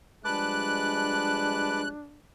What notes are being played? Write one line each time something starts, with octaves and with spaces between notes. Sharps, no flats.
F3 G3 G#3 D4 B4 A5 D6 F#6